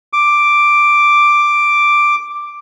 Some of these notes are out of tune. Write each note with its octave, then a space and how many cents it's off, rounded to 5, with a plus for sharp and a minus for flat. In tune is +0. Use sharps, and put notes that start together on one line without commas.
D6 +5